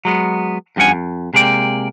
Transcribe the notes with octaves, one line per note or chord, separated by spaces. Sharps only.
F#3 G#3 B3
E2 G2 F3 C#4 F#5 G#5
F2
C3 G#3 A#3 D5 G5